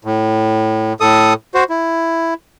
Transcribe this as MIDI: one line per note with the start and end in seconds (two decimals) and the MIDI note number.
0.05 0.93 45
1.00 1.34 45
1.00 1.34 69
1.00 1.34 87
1.55 1.64 66
1.55 1.64 72
1.70 2.34 64